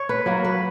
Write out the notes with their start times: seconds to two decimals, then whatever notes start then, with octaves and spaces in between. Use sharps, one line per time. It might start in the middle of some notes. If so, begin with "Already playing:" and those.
Already playing: C#5
0.09 B4
0.26 F#3 A#3
0.45 B4